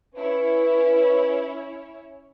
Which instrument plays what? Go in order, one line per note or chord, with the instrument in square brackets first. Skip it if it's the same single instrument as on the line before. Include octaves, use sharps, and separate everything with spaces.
[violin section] C#4 E4 C#5 [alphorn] B4